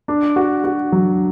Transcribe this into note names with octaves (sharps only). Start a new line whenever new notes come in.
D4
F#4
F#4
F#3